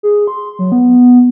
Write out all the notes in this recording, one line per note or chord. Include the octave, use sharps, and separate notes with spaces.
G#4
C6
F#3
B3